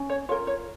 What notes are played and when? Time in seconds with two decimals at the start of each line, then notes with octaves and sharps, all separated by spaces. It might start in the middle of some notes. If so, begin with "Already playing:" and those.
Already playing: C#4
0.09 C#5
0.29 F4 C#5
0.31 A#4
0.47 C#5